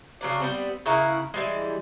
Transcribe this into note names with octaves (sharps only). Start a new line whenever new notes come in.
C#3 F#3 D4
G3 B3 C4
C#3 E4 A#4 F#5
E3 G3 G#3